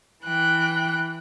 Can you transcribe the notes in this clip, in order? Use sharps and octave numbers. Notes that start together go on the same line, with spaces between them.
E3 G5 F#6